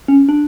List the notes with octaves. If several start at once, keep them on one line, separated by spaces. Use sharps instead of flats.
C#4
D4